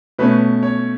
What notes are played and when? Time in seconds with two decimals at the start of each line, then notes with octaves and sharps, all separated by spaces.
0.19 B2 A3 C#4 B4
0.63 C#5